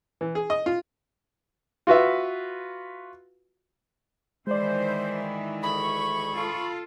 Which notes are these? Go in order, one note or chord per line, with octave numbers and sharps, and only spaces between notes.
E3
G#4
D#5
F4
F4 F#4 B4 E5
D#3 E3 G#3 E4 C5 D5
D2 G#4 B5 C#6
F4 A4